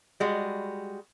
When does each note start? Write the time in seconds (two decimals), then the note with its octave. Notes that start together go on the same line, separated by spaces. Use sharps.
0.20 G3 G#3 F#4